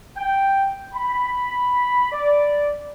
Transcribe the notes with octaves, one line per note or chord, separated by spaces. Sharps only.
G5
B5
D5